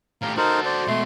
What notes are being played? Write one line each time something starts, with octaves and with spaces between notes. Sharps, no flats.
A2 G4 F5 A#5
D#4 F#4 A4 A#4 C5
C5 D5
B2 G#3 A3 C6